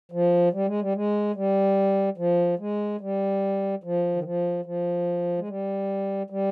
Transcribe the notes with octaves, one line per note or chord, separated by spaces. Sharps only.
F3
G3
G#3
G3
G#3
G3
F3
G#3
G3
F3
D#3
F3
F3
G#3
G3
G3